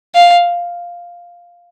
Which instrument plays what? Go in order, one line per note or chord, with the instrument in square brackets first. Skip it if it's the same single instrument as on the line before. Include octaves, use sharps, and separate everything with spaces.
[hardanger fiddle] F5